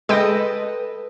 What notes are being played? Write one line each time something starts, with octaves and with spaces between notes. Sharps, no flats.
G#3 A4 B4 D#5 G5